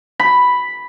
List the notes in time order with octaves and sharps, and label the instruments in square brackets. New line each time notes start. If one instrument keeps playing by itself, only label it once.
[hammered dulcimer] B5